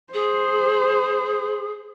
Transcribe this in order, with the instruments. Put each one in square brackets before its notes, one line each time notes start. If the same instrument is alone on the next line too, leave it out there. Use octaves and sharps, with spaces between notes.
[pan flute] G#4 [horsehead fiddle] C5